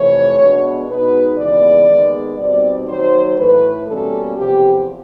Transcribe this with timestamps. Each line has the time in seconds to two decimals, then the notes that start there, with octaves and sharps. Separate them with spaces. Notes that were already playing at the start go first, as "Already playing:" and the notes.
Already playing: F2 C3 E3 A3 C#5
0.39 B2 G#3 B3 D4
0.88 B2 G#3 B3 D#4 B4
1.38 D#2 C#3 E3 G#3 B3 D5
1.89 D#2 D#3 G#3 B3
2.38 B2 G3 C4 D#4 D5
2.88 D#2 D#3 F#3 C5
3.38 A2 E3 A3 B4
3.87 B2 G3 A#3 C#4 A4
4.37 E2 C3 F3 G4